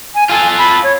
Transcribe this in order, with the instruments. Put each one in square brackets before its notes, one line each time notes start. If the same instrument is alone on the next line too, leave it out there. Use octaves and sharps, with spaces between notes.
[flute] G#5
[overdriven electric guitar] F4 A4 [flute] G#5
[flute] B5
C#5